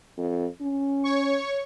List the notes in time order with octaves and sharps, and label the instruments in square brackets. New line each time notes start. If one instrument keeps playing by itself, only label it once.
[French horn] F2
C#4
[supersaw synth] C#5 C#6